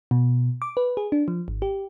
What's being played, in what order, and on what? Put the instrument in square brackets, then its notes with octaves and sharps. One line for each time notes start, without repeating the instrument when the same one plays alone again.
[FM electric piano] B2
D6
B4
G#4
D4
F3
G#1
G4